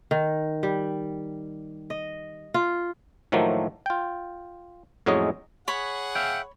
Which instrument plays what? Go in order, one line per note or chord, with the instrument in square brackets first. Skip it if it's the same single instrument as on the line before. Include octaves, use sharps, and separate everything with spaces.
[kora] D#3
G3
D#5
F4
[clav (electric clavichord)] A2 D#3 F3 F#3 A3 A#3
F4 G5
F2 A2 F#3 G#3 C#4 D#5
[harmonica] G#4 F#5 [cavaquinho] C#5 B5
[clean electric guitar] E5 F5 G5